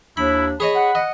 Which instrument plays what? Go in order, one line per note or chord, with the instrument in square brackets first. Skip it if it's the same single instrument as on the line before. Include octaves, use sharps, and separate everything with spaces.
[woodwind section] D#2 D4 [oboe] E4 [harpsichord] B5
[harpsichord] G#4 C#5 D#5 [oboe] B5
[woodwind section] F#5
[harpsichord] D#5